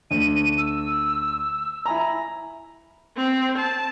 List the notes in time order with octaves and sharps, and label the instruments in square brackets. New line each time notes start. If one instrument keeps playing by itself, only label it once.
[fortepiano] D2 [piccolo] D#7
[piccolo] E6
[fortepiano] E4 G#5 A#5 [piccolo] B5
[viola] C4
A5